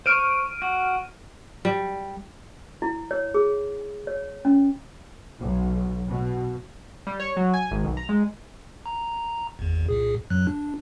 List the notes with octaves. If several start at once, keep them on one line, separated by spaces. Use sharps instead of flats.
C5 C#6 F6 D7 D#7
F#4
G3
E4
C#5
G#4
C#5
C#4
B1
B2
G3
C#5
F#3
G#5
G#1
B1
A#5
G#3
A#5
G#1 E2
C2 A#2 G#4
F#2 F#3 F#6
D4